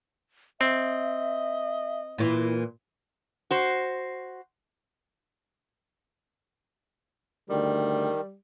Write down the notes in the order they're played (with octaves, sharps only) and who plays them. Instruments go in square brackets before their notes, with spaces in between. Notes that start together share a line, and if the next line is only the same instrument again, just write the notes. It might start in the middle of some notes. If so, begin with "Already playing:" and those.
[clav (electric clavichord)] C4 [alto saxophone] D#5 [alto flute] E5
[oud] A#2 E3 [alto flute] E4
[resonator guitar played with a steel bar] F#4 C5
[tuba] D2 [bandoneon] D#3 [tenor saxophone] G3